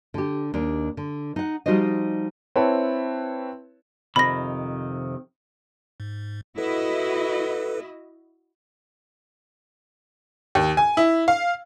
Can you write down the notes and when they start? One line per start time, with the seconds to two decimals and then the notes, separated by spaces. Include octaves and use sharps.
0.14 D3 G4
0.54 D#2 D4
0.97 D3
1.36 D#4 F#5
1.66 F3 G3 D#4 F#4 C5 D#5
2.56 C4 E4 B4 C#5 A5
4.16 F2 C3 D#3 B5 A#6
6.00 G#2
6.58 E4 F#4 A4 B4 D#5
10.55 D#2
10.77 G#5
10.97 E4
11.28 F5